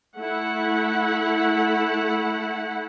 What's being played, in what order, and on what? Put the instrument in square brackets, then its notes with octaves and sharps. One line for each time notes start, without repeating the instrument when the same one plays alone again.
[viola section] A3 E4 F#5